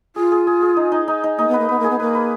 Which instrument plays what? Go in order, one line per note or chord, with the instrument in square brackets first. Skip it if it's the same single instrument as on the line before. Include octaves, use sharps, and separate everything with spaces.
[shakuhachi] F4 [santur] G#4
[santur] G#4
G#4
G#4
D#4
D#4
D#4
D#4
[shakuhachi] A#3 [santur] D#4
[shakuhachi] B3
[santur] B4
[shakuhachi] A#3
[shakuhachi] B3 [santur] B4
[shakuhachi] A#3 [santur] G#4
[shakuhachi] B3
[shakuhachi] A#3 [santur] B4
[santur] B4